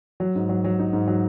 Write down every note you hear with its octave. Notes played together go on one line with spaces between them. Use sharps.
F#3
G#2
F#3
F#3
D#4
G#2
F#3